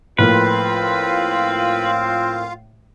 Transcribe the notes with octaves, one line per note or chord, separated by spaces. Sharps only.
A2 F3 A#3 C4 F4 B4 F5